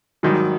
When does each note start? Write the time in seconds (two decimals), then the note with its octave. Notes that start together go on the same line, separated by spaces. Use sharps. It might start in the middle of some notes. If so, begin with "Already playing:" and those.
0.23 G#1 G#2 D#3 F#3 G3